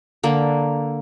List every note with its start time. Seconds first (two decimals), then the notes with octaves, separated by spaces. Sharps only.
0.23 D3 A#3